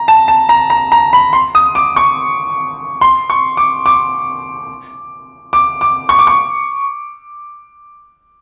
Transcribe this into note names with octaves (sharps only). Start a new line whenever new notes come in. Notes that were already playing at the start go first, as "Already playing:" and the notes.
Already playing: A#5
A5
A5
A#5
A#5
A#5
B5
C6
D#6
D6
C#6
C6
C#6
D6
D6
D6
D6
C#6
D6
C#6